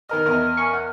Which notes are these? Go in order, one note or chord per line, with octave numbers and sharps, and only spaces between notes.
D#3 A#4 D#5 F6
E2 A#4 D#5
G#5 C#6 C#7
F#5